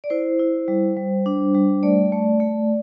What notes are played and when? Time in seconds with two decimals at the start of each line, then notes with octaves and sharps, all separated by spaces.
0.04 D5
0.10 E4 C5
0.39 E4
0.68 G3
0.97 G3
1.26 D4
1.55 G3
1.83 A3 D5
2.12 A3
2.40 A3